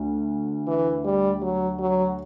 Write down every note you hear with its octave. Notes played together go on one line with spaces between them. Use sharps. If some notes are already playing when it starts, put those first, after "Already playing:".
Already playing: D2 D3
E3
G3
F#3
F#3